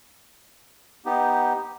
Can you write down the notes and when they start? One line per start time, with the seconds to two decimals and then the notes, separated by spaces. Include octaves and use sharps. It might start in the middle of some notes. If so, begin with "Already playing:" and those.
1.06 B3 D#4 G4